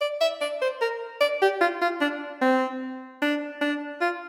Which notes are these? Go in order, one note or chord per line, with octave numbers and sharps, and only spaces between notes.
D5
E5
D5
C5
A#4
D5
G4
F4
F4
D4
C4
D4
D4
F4